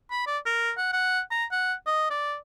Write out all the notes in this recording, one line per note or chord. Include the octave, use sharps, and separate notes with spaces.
B5
D5
A#4
F#5
F#5
A#5
F#5
D#5
D5